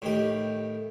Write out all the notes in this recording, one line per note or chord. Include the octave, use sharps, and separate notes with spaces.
A2 D#3 G4